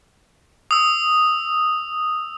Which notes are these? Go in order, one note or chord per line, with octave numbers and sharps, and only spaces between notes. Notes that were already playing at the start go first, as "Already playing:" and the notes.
D#6 E6